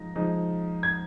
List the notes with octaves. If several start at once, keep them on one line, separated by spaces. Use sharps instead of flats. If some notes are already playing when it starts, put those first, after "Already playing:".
Already playing: F3 G#3 D#4 A#6
F3 G#3 D#4
G#6